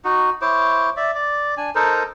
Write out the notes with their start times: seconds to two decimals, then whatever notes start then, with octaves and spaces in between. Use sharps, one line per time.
0.05 D#4 F#4
0.42 E4 C5 C#5 D6
0.97 D5 E5
1.15 D5
1.57 D4 G#5
1.75 D#4 A4 A#4 C5